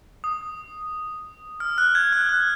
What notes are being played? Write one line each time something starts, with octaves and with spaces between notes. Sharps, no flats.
D#6
F6
F#6
G#6
F#6
F#6